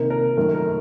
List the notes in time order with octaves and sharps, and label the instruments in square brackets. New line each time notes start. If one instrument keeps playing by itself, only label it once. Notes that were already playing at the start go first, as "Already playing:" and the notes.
Already playing: [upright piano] C3 D#3 A#3 A#4
A#4
F#2 D#3 A3 A#4
A#4